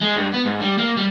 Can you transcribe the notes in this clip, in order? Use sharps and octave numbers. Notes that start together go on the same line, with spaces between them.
G#3
G2
B3
G#2
G3
A#3
G3